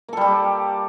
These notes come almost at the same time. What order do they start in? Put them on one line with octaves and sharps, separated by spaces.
A#3 A4 G3 G4